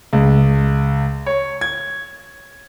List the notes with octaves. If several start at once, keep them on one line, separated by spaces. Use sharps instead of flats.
C#2
C#5
G#6